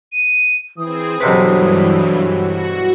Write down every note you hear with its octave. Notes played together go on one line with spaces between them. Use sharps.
D#7
E3 C4 G#4 D#6
B1 G2 C3 E3 F#3 B4
F#4